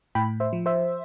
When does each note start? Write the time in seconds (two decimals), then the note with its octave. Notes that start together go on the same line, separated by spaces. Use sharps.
0.15 A2 G5 B5
0.40 C5 E5
0.53 F3
0.66 C5 E5